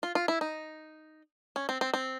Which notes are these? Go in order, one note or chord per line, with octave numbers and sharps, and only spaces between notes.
F4
F4
E4
D#4
C#4
C4
C4
C4